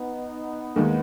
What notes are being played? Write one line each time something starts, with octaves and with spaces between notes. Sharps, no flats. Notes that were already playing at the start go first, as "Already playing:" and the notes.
Already playing: B3 D#4
D#2 D#3 G#3